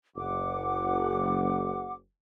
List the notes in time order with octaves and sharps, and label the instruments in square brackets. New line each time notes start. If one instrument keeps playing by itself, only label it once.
[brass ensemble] F#1 [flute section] F#5 D6